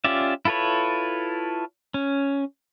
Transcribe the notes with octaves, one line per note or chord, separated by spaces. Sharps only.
C#4 F4 G4 D5 E5
E4 F4 A4 B4 C#5
C#4